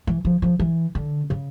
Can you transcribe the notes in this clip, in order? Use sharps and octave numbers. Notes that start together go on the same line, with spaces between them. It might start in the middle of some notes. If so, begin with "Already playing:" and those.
E3
F3
F3
E3
D3
C#3